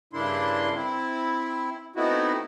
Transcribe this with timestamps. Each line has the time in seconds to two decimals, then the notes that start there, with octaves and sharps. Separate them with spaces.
0.13 G2 C#3 A#3 D4 E4 C6
0.74 C4 E4
1.96 A3 B3 C4 D#4 E4 F#4